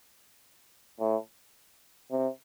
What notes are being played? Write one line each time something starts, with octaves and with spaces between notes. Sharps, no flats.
A2
C3